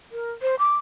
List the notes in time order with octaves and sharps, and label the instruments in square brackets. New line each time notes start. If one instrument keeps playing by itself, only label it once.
[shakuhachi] A#4
C5
D6